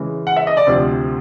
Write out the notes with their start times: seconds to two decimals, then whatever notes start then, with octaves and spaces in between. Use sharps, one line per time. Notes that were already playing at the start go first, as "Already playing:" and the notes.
Already playing: C#3 E3 G#3
0.27 F#5
0.36 E5
0.47 D#5
0.57 D5
0.67 D2 C3 F3